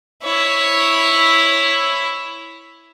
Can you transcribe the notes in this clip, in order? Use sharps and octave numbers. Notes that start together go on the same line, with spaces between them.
E4 C#5